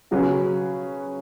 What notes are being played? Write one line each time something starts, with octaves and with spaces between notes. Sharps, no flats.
C#3 F#3 C#4 G#4 B4